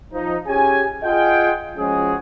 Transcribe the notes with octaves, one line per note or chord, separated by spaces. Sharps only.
F3 D#4
C#4 G4 G#4 G#5
F4 G#4 D#5 F#5 G5
F3 G#3 C#4 F#4 G#4